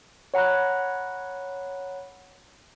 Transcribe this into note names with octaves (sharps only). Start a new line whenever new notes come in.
C#5 F#5 A#5 B5 F#6